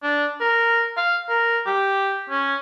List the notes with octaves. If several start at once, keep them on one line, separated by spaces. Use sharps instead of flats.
D4
A#4
F5
A#4
G4
C#4